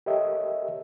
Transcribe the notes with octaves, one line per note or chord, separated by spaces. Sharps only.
G4 A4 A#4 C#5 D#5 E5